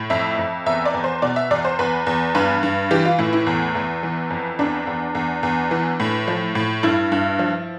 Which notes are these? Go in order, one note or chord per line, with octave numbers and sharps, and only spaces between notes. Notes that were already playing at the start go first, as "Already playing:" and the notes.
Already playing: A2
F2 E5
F2
E2 E5
D5
E2
C5
B2 D5
E5
E2 D5
C5
E2 B4
E2
G2 B4
G2
E3 G4
F4
A2 E4
E4
E2
E2
E3
F2
E2 D4
E2
E2
E2
E3
A2
F3
A2
G2 E4
G2
F3